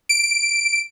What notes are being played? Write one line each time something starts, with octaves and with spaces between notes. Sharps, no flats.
D7